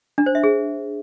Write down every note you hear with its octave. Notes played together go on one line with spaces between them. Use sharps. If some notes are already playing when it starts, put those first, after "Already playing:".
D4
C5
E5
G#4